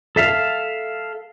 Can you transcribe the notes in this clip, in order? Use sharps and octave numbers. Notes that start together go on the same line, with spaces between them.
A4 E5 F5